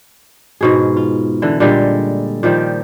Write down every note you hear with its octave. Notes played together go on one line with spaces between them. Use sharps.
G#2 B2 G#4
F4
D3 E3
A#2 D3 G3 G#3
A#2 D#3 F3 G3